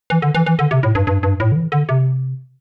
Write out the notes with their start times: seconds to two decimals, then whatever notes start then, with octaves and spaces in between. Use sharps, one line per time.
0.10 E3
0.22 D3
0.35 E3
0.46 E3
0.59 D3
0.71 C3
0.83 A2
0.95 G2
1.07 G2
1.23 G2
1.40 A2
1.52 D3
1.56 E3
1.72 D3
1.89 C3